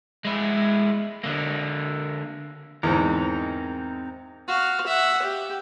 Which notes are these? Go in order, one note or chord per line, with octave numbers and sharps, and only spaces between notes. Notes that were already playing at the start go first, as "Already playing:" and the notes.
G#3 E4
D3 A#3
E2 G#2 C4 D#4 A#4
F#4 F5
E5 F#5
G4